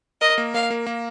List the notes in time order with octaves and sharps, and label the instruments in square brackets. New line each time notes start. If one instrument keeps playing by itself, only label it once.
[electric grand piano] A#4 [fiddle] D#5
[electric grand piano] A#3
[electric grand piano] A#3 [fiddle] F5
[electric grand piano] A#3
A#3